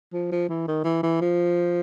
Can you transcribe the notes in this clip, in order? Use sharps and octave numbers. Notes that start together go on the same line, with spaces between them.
F3
F3
E3
D#3
E3
E3
F3